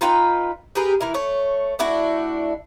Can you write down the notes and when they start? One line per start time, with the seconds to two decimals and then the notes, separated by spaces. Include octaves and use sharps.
0.01 D#4 F4 B4 G5
0.75 G4 G#4 A#4 B4
1.01 E3 E4 A#4
1.14 A3 C#5
1.79 A3 D4 E4 F#4